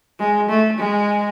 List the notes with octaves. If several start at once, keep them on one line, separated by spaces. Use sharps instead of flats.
G#3
A3
G#3